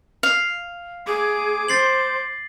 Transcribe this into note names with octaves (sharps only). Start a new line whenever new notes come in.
F5
G#4 D6
C5 A6 C7 F#7